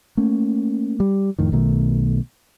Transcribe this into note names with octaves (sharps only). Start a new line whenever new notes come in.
A3 A#3 C#4
G3
F2 A2 D#3
B1 B2 D#3 A3